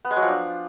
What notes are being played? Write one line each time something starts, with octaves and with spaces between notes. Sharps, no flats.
B3
G#3
F#3
F3
D4